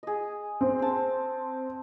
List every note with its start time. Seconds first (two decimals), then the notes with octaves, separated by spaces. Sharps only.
0.03 G#4 D#5
0.61 C4
0.79 C5 A5